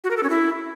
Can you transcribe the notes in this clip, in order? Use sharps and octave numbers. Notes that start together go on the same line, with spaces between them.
F#4
A#4
A4
C#4
E4